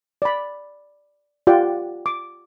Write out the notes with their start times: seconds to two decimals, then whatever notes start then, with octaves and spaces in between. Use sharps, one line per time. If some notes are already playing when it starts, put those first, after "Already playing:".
0.22 D5 B5
1.47 F4 G4 D5 F#5 G5
2.06 D6